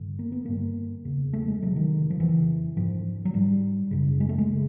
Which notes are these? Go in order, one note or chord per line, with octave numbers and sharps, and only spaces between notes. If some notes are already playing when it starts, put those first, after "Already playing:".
Already playing: G2 D3
A#3
B3
G2 D3 A#3
E2 C#3
A3
G#3
E2 C3 F#3
D#3
F3
F2 C#3 E3
G#2 F3
F#3
G#2 G3
F#2 C#3
G#3
A3
G#3
C#3